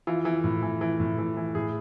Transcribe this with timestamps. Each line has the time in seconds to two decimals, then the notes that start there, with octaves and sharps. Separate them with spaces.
0.07 E3 F4
0.25 E3
0.44 A2
0.63 E3
0.81 E3
1.00 A2
1.18 E3
1.37 E3
1.55 A2 G#4